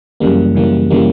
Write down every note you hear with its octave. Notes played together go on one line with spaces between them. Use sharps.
F#2 C#3 E3 G3 A#3
F#2 C#3 E3 G3 A#3
C#3 E3 G3 A#3